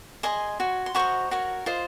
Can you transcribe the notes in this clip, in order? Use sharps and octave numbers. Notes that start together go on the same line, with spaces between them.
G#4 D#5 G#5 C6
F#4 C#5
C6
F#4 C5 D#5 A#5 C#6
F#4 A#4 C#5
F4 C5 D#5